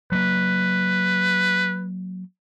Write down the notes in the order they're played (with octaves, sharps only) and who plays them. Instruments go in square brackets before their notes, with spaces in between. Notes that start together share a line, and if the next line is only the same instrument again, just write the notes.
[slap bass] F#3 A#3 [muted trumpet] B4